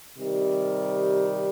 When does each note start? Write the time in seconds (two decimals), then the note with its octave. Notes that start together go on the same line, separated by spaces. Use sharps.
0.18 C3 D#3 G3